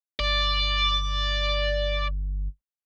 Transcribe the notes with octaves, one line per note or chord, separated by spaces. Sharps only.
G1 D5